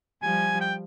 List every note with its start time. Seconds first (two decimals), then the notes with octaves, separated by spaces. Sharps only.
0.22 F3 G3 G#5
0.61 G5